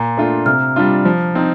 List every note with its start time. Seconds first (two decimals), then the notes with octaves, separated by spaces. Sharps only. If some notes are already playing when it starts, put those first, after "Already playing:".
Already playing: A#2 A#5
0.18 A3 D4 F4
0.46 C3 F6
0.76 G3 D4 F4
1.05 F3
1.35 C4 D#4